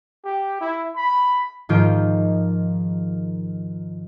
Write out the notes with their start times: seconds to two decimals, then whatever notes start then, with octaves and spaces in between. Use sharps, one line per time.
0.25 G4
0.60 E4
0.96 B5
1.69 G#2 D#3 F3 F4 G6 D7